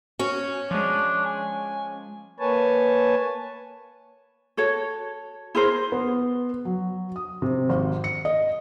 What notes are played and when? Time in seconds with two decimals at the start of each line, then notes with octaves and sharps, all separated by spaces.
0.19 C#4 F#4
0.71 F3 G#3 D4
1.25 G#5
2.40 A#3 B4 C#5 G#5 A5
4.57 F#4 A4 C#5
5.55 E4 G#4 A#4 C5
5.92 B3
6.65 F#3
7.16 D#6
7.42 C3
7.69 G#1
8.04 C#7
8.25 D#5